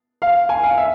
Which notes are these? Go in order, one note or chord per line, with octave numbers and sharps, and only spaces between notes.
F5
G#5
F5
E5